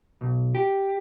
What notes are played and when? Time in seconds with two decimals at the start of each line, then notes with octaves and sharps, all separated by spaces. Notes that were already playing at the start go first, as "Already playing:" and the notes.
0.21 B1
0.55 G4